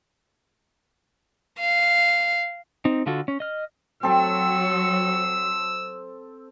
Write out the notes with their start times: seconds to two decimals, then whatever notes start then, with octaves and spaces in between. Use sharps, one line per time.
1.59 F5
2.85 C4 D#4
3.06 D3 F4 F#4 A4
3.28 C#4
3.40 D#5 F6
4.03 F#3 C4 A4 E6